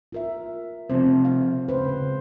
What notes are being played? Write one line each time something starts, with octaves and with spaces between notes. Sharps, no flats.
F4 A#4 E5
C3 E3 F3 C4 C5
F5
C#2 B4 C5
C#3